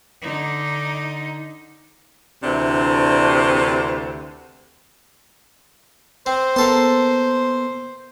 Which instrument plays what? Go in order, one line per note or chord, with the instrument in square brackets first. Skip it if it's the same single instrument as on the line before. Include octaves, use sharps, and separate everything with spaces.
[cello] D3 D#4
[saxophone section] D2 C3 E3 D4
[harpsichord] C4 [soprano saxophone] C5
[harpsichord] A#3 A4 C6 [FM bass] B3